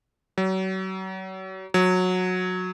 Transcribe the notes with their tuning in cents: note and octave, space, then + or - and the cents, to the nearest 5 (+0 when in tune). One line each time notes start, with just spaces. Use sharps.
F#3 +35
F#3 -15